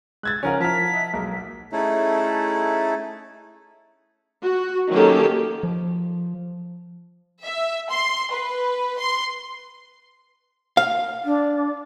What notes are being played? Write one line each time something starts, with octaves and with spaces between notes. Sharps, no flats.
G#3 E6 F#6 G#6 A6
C#3 F3 C#4 D#4 A#4 F#5 G#5
F3 E4 A5 A#5 F6 B6
D#5 E5 F#5
B1 G#3 A#3 A#4
A3 C#4 D#4 E4 G#4 A4
F#4
D#3 F#3 A#3 C#4 G4 A4
F3
E5
C6
B4
C6
F5
D4